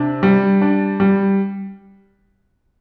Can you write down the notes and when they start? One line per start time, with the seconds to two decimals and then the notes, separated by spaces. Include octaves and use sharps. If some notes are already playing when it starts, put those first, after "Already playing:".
Already playing: C3 D4
0.23 G3
0.61 D4
1.00 G3